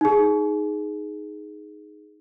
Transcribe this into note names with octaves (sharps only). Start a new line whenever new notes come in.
D#4 G#4